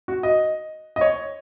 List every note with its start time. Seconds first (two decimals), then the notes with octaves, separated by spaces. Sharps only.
0.08 F#4
0.23 D#5
0.96 D#5
1.01 C#5